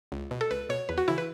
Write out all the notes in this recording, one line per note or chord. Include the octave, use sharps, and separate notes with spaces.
C#2
B2
A4
C#2 B4
B2 C#5
E2 B4
F#4
C#3 E3 E4
B4